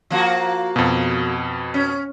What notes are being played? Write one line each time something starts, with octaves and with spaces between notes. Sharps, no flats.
F3 A#3 F#4
F2 B2
C#4